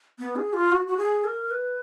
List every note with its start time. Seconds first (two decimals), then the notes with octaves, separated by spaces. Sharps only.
0.19 B3
0.36 G#4
0.53 F4
0.72 F#4
0.87 F#4
0.98 G#4
1.24 A#4
1.51 B4